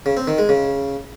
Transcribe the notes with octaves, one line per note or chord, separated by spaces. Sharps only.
C#3
C4
D#3
G#3
C#3